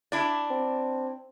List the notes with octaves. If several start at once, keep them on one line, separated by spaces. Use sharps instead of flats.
D4 E4 D5
C4